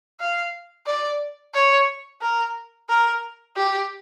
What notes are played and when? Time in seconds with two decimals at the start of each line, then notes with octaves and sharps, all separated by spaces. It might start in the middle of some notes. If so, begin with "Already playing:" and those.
0.20 F5
0.86 D5
1.54 C#5
2.21 A#4
2.89 A#4
3.57 G4